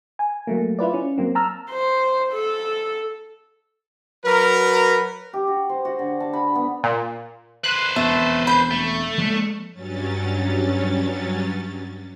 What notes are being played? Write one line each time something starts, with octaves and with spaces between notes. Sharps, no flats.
G#5
F#3 A3 A#3
E4 F4 B4 D5
C#4
F#3 A#3 C4
A5 A#5 E6 F6
C5
A4
F#3 A#4 B4
G4
F#4
C5
F#4
D3
A5
B5
B3
A#2
B4 C5 F#6
E1 F2 A3 B3
B5 G6
A3
F3 G#3 A#3
G2 F#3 C#4 A6